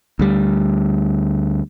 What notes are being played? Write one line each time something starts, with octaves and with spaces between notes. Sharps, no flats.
D2 G3